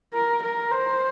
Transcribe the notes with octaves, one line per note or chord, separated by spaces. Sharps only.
A#4
A#4
C5